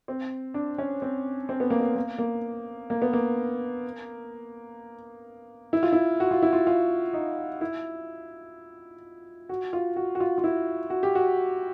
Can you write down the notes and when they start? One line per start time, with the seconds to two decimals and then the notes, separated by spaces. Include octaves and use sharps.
0.08 C4
0.54 D4
0.78 C#4
1.02 C4
1.49 C4
1.60 B3
1.70 A#3
1.80 B3
1.96 A#3
2.18 A#3
2.90 A#3
3.02 B3
3.13 A#3
5.73 E4
5.83 F4
5.93 E4
6.20 F#4
6.31 F4
6.42 E4
6.53 F4
6.67 F4
7.13 D#4
7.61 E4
9.49 F#4
9.73 F4
9.96 F#4
10.15 F#4
10.20 F4
10.38 F4
10.44 E4
10.90 F#4
11.03 G4
11.15 F#4